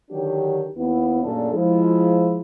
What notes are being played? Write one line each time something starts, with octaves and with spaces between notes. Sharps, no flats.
D3 D#3 F#3 D4 G4
D#2 B3 E4
F#2 A#2 A3 D4 G#4 A4
F3 G#3 E4